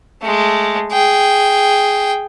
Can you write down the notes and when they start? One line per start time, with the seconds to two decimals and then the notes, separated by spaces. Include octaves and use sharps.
0.22 G#3 A3
0.92 G#4 G5